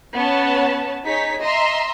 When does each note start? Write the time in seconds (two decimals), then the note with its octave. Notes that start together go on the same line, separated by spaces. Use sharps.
0.14 B3 C#4 C#5 A5
1.05 D#4 G#4 C#5 B6
1.42 D#5 E5 A#5 C6